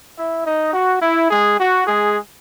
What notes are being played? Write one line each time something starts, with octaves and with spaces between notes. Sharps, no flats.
E4 E5
D#4 D#5
F#4
E4
G#3 G#4
F#4
G#3 G#4